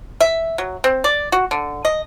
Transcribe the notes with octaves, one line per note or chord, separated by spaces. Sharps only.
E5
F#3
C4
D5
F#4
D3
D#5